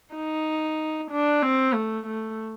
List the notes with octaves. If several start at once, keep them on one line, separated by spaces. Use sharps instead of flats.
D#4
D4
C4
A3
A3